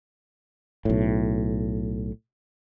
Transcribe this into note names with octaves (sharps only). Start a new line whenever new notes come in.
B1 A2